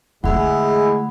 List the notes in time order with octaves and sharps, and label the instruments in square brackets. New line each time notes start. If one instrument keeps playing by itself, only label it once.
[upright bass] D3 A3 [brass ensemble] G#3 G#4 [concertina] E4 [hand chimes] F#5 B5